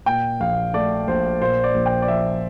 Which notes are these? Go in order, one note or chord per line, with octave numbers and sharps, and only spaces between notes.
A#2 G5
A#1 F5
A3 D5
A#1 C5
A#2 C5
D5
A#1
G5
D5
F3 E5